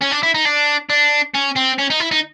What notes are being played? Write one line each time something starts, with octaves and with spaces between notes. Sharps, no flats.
C#4
D4
E4
D#4
D4
D4
C#4
C4
C#4
D#4
E4
D#4